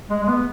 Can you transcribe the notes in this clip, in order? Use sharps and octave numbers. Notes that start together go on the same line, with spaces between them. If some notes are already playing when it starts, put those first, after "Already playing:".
G#3
G#3
B3